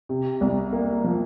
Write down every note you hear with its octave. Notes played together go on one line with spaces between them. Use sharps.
C3
C2
A#3
F3